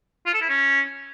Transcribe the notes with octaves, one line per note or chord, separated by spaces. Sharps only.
F4
A4
E4
C#4